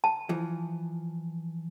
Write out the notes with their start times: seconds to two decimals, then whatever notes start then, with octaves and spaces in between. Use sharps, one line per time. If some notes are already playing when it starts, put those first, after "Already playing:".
0.04 A5
0.29 E3 F3